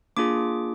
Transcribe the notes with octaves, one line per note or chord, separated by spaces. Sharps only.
A#3 D4 F4 G#4 D6